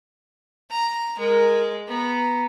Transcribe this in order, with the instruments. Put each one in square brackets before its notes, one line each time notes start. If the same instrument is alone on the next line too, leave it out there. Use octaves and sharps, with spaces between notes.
[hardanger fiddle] A#5
[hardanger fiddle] G#3 [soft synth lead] A#4
[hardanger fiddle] B3 [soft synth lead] A#5